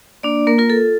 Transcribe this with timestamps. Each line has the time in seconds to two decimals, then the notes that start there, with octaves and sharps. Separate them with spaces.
0.23 A#3 D4 D5
0.47 A#3 A#4
0.58 F4 A#4
0.70 A4